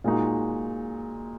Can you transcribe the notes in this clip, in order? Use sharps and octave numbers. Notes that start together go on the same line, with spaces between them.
A#2 G#3 D#4 F#4